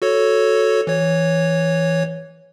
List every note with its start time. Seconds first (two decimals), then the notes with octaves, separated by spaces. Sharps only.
0.02 F#4 A4 C#5
0.87 E3 C#5